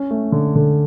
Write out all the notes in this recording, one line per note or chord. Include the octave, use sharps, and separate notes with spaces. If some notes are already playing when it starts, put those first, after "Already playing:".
Already playing: C#4
A3
D3
D3